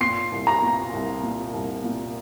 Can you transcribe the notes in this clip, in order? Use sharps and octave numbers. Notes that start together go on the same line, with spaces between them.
A#2 C6 C7
C2
A#5 A#6
A#2
C2
A#2
C2
A#2